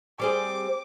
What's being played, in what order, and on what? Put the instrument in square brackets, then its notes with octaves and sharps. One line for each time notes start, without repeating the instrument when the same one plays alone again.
[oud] G3 C4 G#4 [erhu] D6